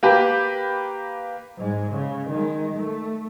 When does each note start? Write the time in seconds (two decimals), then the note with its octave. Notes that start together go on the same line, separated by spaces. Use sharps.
0.03 A#3 G4 B4
1.57 G#2 G#3
1.91 C#3
2.29 D#3 G#3
2.76 A3